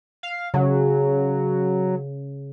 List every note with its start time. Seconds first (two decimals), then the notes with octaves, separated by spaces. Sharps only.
0.23 F5
0.54 C#3 F#3